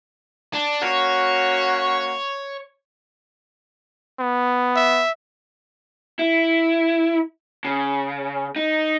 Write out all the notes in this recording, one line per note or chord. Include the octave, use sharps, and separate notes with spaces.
D4
A#3 C#4 F#4 C#5
B3
E5
E4
C#3
D#4